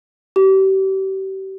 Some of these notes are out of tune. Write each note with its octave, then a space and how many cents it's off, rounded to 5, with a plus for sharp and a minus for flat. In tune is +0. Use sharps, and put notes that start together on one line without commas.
G4 -35